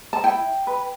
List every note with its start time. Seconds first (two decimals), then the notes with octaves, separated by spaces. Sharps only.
0.13 A5
0.24 E4 G5
0.67 B4